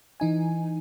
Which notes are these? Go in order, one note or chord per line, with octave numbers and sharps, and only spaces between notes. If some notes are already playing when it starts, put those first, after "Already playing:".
E3 D#4 G#5